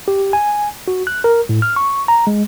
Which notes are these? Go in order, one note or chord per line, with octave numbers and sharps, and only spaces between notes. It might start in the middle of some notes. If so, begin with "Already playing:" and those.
G4
G#5
F#4
F#6
A#4
A2
F6
C#6
A#5
G#3